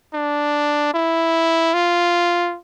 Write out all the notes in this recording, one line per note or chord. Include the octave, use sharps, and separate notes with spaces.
D4
E4
F4